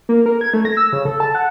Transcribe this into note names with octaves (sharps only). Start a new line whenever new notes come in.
A#3
A#4
G#6
A3
A#6
E6
C#3
A4
A5
F#5